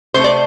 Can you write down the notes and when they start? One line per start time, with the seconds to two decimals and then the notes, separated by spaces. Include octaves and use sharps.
0.14 C3 A3 C5
0.24 D5